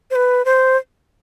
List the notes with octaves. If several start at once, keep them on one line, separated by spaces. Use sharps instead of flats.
C5
B4
C5